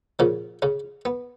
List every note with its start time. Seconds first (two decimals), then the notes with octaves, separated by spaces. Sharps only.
0.19 A#2 C#3 F3 C#4
0.62 C#3 C#4
1.05 B3